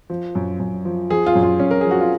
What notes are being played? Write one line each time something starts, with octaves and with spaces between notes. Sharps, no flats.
F3
F#2
F#2
F3
F3 G#4
F4
F#2
F4
F#2 C#4
A#4
F3 G#4
F#4
F4